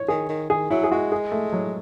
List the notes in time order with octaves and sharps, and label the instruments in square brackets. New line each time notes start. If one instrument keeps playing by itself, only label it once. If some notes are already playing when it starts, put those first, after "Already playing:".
Already playing: [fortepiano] C#5
[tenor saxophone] D#3 [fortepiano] G#4
[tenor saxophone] D#3
[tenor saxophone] D#3 [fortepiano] G#4
[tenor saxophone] F#3 [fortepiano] E4
[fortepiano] G#4
[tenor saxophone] G#3 [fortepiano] F#4
[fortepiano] G#4
A3
F#3